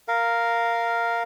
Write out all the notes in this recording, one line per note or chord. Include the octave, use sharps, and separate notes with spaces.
A#4 F5